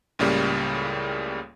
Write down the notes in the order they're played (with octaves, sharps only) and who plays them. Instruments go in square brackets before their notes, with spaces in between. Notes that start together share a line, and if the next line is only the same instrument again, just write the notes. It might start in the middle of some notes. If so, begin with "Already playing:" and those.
[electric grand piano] C#2 A2 C#3 G3 A#3